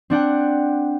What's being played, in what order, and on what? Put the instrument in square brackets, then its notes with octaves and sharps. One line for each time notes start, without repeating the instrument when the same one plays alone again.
[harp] C4 D4 F#5 G5